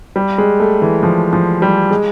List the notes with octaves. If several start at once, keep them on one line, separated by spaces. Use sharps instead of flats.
G3
G#3
A3
E3
F3
F3
G3
G#3